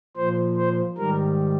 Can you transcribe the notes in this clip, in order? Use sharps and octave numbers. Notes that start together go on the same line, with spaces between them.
A#2 F3 C5
C5
G#2 D#3 G3 A#4